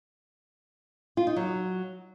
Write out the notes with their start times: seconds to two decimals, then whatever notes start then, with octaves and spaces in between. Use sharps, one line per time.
1.17 F4
1.27 D#4
1.36 F#3